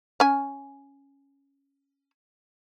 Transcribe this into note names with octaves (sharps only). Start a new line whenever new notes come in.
C#4 G#5